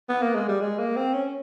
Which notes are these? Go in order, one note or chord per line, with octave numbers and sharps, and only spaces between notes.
B3
A#3
G#3
G3
G#3
A#3
C4
C#4